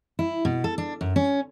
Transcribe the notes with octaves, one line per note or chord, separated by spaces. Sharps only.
E4
B2
A4
D4
F#2
C#4